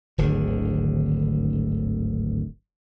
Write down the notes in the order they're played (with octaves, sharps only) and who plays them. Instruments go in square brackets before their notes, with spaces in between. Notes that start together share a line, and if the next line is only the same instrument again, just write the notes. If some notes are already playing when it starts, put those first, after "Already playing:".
[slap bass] D1 G#1 D3 D#3